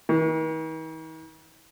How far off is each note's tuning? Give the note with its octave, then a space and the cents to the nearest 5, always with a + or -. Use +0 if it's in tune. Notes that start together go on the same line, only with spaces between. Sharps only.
D#3 +45